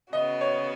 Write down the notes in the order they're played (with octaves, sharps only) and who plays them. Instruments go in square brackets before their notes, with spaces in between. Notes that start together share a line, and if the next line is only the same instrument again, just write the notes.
[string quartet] C#3 B3 F#4 [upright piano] D#5
[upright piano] C#5